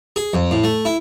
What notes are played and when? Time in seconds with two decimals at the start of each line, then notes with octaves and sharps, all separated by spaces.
0.16 G#4
0.34 F2
0.51 A2
0.64 A3
0.85 E4